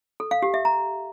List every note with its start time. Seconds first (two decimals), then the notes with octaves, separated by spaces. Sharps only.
0.20 A4
0.31 F5
0.42 G4
0.54 E5
0.65 A#5